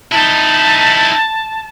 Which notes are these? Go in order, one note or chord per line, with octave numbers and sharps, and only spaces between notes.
D#4 E4 A5